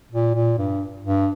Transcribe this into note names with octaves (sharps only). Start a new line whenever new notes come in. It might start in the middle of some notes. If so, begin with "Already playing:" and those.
A#2
A#2
G2
G2